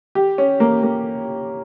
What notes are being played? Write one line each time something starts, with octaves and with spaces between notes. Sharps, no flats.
G4
C#4
A#3
A#3